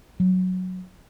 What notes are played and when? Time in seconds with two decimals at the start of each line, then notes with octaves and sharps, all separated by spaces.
0.20 F#3